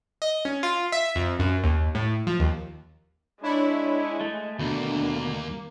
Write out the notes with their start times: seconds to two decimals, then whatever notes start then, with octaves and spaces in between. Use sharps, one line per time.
0.22 D#5
0.45 C#4
0.63 F4
0.92 E5
1.16 F2
1.39 F#2
1.64 D#2
1.95 A2
2.27 F3
2.40 D#2
3.42 G#3 D4 E4 C#5
4.21 A3
4.59 D#2 B2 D3 A3 A#3